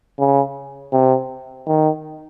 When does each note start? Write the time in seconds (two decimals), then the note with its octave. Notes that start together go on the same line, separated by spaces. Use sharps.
0.19 C#3
0.92 C3
1.67 D#3